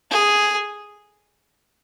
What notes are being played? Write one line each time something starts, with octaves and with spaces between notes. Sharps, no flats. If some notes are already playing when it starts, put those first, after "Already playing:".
G#4